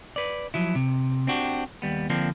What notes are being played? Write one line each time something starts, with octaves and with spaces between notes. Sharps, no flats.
B4 D5
F3 F#3 E4
C3
C4 D4 F#4 G4
D#2 G3 B3
D3 F3 A#3 C4 D4